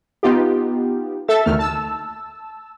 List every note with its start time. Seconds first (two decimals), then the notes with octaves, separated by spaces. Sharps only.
0.23 B3 D#4 F4 G4
1.28 A4 E5 E6 A6
1.46 D2 D#3 A3 F6
1.59 A5 E6